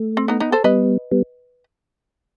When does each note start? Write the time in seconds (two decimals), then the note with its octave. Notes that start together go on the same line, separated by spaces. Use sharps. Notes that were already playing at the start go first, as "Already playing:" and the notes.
Already playing: A3
0.17 C4
0.28 B3 D#4
0.40 B3 D#4
0.52 A4 C5
0.64 G3 B3 B4 D#5
1.11 G3 B3